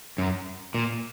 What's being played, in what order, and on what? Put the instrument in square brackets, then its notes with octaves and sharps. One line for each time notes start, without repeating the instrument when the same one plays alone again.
[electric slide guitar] F#2
A#2